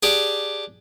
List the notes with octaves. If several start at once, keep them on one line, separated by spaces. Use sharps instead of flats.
D4 G4 G#4